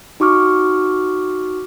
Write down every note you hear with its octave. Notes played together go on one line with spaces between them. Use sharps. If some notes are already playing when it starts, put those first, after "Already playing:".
D#4 F#4 C#6 D6 F6